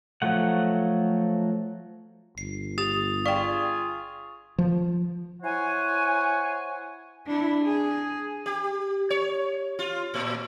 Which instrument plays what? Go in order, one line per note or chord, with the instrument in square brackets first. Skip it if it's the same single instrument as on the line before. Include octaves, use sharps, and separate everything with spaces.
[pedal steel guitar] F3 F#3 A3 F#5
[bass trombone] G1 [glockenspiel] C7
[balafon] G4 [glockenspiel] D#6 A6 F7
[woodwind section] F4 G#4 [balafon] D5 G5 [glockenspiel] C#6
[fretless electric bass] F3
[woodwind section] E4 C5 C#5 F#5 G#5
[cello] D4 E4
G#4
[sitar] G4
C#5
F4
A2